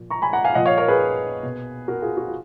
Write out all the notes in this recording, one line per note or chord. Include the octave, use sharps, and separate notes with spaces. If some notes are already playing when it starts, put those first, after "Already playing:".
Already playing: A#2 F3
A#5 C#6
G#5 B5
F#5 A#5
F5 G#5
A#2 F3 D#5 F#5
C#5 F5
A#4 C#5
G#4 B4
B2
F#4 A#4
F4 G#4
F#4
F4